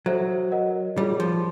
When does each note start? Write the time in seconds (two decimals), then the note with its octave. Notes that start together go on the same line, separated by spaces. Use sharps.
0.06 F#3 A4 C5 E5
0.52 A#4 D#5 F#5
0.97 G3 F4 G#4 C#5
1.20 F3